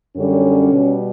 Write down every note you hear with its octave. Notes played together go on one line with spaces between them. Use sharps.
F#2 D3 G3 C#4
B2 G3